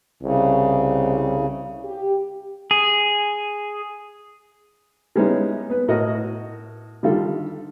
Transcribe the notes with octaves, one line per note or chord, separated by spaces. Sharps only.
C2 C#3
G4
G#4
G3 G#3 B3 C#4 D#4 E4
B3 B4
A2 F#4 A#4 D#5
D3 D#3 G3 F4 A4